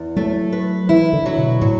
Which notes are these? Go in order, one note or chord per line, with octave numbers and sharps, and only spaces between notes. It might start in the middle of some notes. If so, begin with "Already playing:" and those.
Already playing: E2
F#3 A3
B4
E3 E4
D3
F#3
B2
A2 F#3